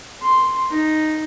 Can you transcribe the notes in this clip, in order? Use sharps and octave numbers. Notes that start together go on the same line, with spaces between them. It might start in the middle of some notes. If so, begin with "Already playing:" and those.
C6
D#4